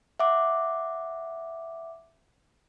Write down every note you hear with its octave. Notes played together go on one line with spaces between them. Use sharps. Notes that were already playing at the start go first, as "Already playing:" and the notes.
E5 F#5 D6